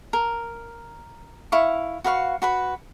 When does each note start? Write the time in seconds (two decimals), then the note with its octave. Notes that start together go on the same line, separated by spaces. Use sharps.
0.13 A#4
1.52 E4 F5 C#6
2.04 F#4 B4 F5 C#6
2.42 F#4 B4 B5